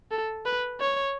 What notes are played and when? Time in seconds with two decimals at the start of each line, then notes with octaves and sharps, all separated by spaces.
0.11 A4
0.46 B4
0.80 C#5